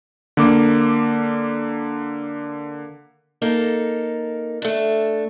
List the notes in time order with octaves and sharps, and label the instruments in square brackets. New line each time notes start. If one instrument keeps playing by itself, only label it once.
[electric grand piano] D3 A#3 D6
[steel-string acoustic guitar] A#3 D#4 A4
A3 D4